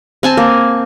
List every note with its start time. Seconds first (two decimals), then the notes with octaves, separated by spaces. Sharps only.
0.23 C4 G#5 A5
0.37 A#3